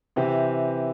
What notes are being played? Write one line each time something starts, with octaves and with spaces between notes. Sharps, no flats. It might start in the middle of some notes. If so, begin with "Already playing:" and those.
C3 E3 C4 G4